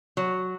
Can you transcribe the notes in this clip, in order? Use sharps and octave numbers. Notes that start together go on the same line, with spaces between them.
F#3